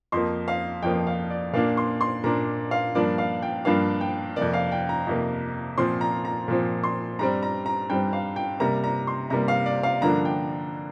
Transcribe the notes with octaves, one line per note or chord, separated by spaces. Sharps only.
F2 F3 A#3 C6
F5
F2 F3 A#3 G5
F5
D5
A#2 A#3 D4 F5
C6
C6
A#2 A#3 D4 A#5
F5
G2 F3 A#3 D4 D5
F5
G5
G2 F3 A#3 D4 F5
G5
F2 C3 A#3 D5
F5
G5
A#5
F2 C3 A#3
A#2 F3 C4 C6
A#5
A#5
A#2 F3 C4
C6
G2 G3 C4 A#5
A#5
A#5
G2 G3 C4 G5
F5
G5
C3 G3 A#3 A#5
A#5
C6
C3 G3 A#3 A#5
F5
D5
F5
G2 D3 F3 A#3 D4 A#5
G5